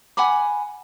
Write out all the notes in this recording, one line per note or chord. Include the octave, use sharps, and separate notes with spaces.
F#5 G#5 B5 D6